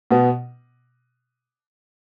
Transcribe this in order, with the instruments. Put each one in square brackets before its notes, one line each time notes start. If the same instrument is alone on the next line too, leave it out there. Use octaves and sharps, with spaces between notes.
[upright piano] B2 B3